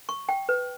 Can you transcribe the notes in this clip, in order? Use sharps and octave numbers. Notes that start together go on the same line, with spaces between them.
C#6
G5
B4